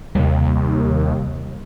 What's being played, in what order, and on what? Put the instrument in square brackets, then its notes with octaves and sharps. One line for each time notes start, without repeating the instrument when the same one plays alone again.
[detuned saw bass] D#2 [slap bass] C3 G3